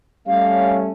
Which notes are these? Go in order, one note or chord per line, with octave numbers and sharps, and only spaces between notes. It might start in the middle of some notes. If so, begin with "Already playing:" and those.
G3 A3 C#4 F5